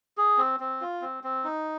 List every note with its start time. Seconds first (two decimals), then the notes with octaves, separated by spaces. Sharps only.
0.17 G#4
0.38 C4
0.60 C4
0.81 F4
1.02 C4
1.24 C4
1.44 D#4